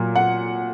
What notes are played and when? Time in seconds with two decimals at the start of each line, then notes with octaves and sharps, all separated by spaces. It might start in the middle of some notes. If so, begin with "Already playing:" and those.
Already playing: A#2 F#3
0.16 F#5